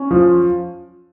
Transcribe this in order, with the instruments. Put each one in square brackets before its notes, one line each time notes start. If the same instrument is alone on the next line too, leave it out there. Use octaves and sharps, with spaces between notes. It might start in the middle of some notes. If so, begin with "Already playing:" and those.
Already playing: [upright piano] C#4
F3